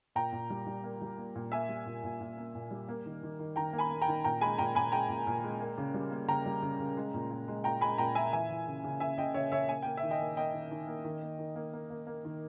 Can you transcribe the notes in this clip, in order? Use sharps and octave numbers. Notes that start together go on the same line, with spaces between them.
A#2 G5 A#5
A#2
G3
G3
A#3
G3
A#3
A#2
A#3 E5 G#5
G3
A#2
A#2
A#2
A#3
A#2
G3
A#3
D#3
D#3
D#3
D#3 G5 A#5
A#3
G#5 B5
A#3
G5 A#5
D#3
A#2 G5 A#5
G#3 G#5 B5
A#2 G5 A#5
A#2 G#5 B5
G#3 G5 A#5
A#2
A#2
G#3
A#3
C#3
G3
A#3
C#3 G5 A#5
G3
C#3
C#3
G#3
A#2
A#2
G#3
A#2 G5 A#5
G#3 G#5 B5
A#2 G5 A#5
A#2 E5 G#5
E3 E5 G#5
E3
C#3
C#3
C#3 E5 G#5
C#3 D#5 G5
C#3 C#5 E5
C#3 C#5 E5
A#3 G#5
A#3 G5
E5
D#3
D#5 G5
A#3
A#3 D#5 G5
D#3
D#3
A#3
D#3
A#3
D#3
A#3
A#3
A#3
A#3
D#3